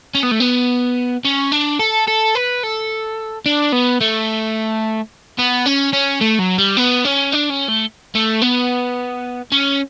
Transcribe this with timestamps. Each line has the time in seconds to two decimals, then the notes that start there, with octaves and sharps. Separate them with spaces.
0.15 C#4
0.23 B3
0.31 A3
0.40 B3
1.25 C#4
1.52 D4
1.79 A4
2.07 A4
2.35 B4
2.63 A4
3.46 D4
3.72 B3
4.01 A3
5.39 B3
5.66 C#4
5.93 C#4
6.21 A3
6.39 F#3
6.58 G3
6.77 B3
7.05 C#4
7.32 D4
7.50 C#4
7.68 A3
8.15 A3
8.42 B3
9.52 C#4